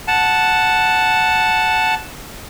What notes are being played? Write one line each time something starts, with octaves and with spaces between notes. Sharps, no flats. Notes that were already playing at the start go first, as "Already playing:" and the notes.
F#5 A5